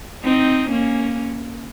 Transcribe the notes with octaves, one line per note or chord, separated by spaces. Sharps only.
C4 D#4
A#3 C#4